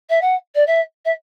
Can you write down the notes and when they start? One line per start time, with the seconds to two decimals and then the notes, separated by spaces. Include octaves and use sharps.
0.10 E5
0.21 F#5
0.55 D5
0.67 E5
1.05 E5